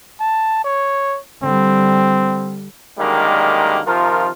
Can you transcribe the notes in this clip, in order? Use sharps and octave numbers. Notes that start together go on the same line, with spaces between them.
A5
C#5
D3 G3 C4
F#2 D3 D#3 G3 G#3 A#3
C3 D#3 F3 F4 A#4